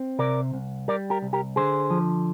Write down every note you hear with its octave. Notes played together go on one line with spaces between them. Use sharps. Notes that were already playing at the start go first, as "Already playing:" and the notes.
Already playing: C4
C3 A#4 D5
C2
G3 A#4 D5
G4 A#4
C2
G4 A#4
D3 G#4 C5
F3